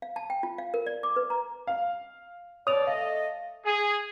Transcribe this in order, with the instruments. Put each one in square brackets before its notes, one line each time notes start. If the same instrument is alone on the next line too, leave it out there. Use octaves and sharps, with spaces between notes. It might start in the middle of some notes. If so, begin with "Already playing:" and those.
[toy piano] F5
A5
G5
F4
F5
A#4
D5
D6
B4
A#5
[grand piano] F5
[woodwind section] B2 D5 [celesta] C#5 F7 [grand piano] D#6
[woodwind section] A3 A4 D#5 [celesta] F5
[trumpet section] G#4